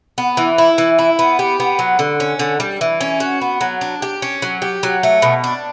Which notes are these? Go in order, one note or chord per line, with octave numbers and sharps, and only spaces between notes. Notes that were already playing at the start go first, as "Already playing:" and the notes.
B3
E3
E4
E3
E4
B3
G4
B3
F#3
D3
C#4
D3
G3
E3
C#4
F#4
B3
F#3
D4
G4
C#4
F#3
G4
F#3
A3
B2
D4